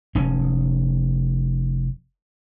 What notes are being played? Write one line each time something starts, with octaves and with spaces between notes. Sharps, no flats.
F1 C#4